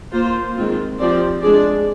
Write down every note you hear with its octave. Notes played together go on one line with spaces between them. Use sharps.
A#3 F4 C5
D#3 G#3 C4 F4
F3 C4 G4 D5
G#3 D4 G#4 D5